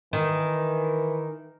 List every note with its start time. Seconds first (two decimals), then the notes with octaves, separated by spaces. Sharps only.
0.13 D#3 E3